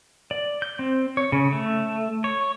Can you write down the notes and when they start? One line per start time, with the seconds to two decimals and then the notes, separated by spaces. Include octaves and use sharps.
0.31 D5
0.62 G6
0.79 C4
1.17 C#5
1.32 C#3
1.52 A3
2.24 C#5